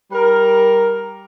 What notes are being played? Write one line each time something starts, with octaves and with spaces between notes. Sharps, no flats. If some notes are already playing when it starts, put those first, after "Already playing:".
G3 A#4